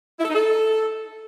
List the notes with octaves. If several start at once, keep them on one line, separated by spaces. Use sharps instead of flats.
E4
A4
D#4
A4